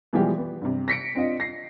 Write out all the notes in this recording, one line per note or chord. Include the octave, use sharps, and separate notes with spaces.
B2 E3 F3 G3 G#3 G4
B3
G2 C3
A#6 B6 C#7 D7
C4 D4 F4 D#5
A#6 C7